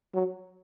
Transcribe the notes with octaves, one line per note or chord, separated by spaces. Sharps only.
F#3